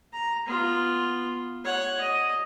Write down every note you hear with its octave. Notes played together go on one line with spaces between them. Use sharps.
A#5
B3 F4
C#5 F#5
D#5